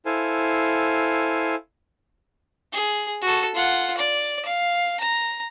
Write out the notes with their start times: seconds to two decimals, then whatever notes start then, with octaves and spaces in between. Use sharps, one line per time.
0.06 E4 A4 C5 F5 G#5
2.73 G#4
3.22 F#4 A4
3.55 F4 F#5
3.97 D5
4.45 F5
5.00 A#5